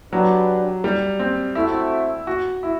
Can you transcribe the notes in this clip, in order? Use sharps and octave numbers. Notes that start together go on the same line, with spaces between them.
F#3 D4 G4 B4 D5 F#5
G3
C4
A3 C4 E4 F#4 A4 E5
F#4
E4